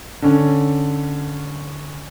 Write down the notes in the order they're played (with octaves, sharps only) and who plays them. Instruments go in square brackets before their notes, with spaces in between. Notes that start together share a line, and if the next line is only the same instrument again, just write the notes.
[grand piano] D3 C#4